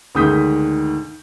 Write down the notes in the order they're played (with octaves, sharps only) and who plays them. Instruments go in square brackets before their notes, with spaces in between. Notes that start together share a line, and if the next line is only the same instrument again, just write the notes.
[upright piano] D2 D#3 G#3 D#6 G6 B6